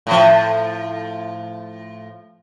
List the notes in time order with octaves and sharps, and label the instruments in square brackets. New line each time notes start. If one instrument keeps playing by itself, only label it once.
[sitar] A2 F3